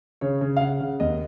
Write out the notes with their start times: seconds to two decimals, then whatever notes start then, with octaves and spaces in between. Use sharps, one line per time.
0.21 C#3 C#5
0.41 C#3
0.57 F5
0.61 C#3 F#5
0.81 C#3
1.00 D#2 D#5